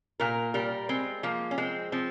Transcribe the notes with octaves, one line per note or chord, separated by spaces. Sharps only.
A#2 A#4
G3 A#4
G#3 C4
F3 A#3
C#4
G#3 C4
F3 C4